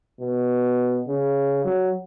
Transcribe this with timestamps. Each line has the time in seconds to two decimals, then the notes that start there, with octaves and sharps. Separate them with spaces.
0.20 B2
1.08 C#3
1.64 F#3